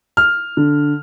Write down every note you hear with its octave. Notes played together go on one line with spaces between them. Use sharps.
F6
D3